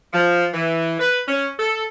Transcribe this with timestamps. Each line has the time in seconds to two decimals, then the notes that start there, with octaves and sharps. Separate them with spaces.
0.13 F3
0.53 E3
0.99 B4
1.27 C#4
1.59 A4